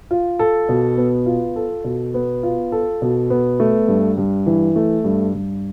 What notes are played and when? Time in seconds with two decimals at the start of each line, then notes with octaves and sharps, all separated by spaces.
0.11 F4
0.39 A4
0.69 B2
0.97 B3
1.26 F4
1.56 A4
1.84 B2
2.14 B3
2.43 F4
2.72 A4
3.02 B2
3.30 B3
3.60 A3
3.88 G2
4.17 G2
4.46 E3
4.76 A3
5.04 G2
5.34 G2